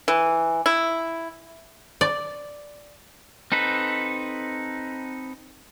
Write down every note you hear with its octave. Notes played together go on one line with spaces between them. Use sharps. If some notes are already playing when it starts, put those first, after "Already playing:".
E3
E4
D5
C4 D#4 A4 B4